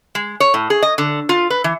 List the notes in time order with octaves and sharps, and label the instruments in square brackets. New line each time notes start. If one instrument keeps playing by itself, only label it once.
[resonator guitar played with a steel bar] G#3
C#5
A2
G#4
D#5
D3
F4
B4
E3